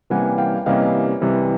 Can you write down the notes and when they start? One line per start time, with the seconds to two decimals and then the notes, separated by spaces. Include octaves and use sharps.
0.10 C3 E3 G3 A#3 C#4 F#5 G#5
0.38 F5 G5
0.66 C3 E3 G3 A#3 C#4 D#5 F5
1.22 C3 E3 G3